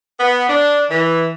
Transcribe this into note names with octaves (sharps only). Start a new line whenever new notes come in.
B3
D4
E3